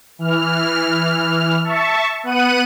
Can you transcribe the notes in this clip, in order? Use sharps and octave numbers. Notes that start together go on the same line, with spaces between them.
E3 F6
E5 A5 C#6
B3 F#5 F#6 D#7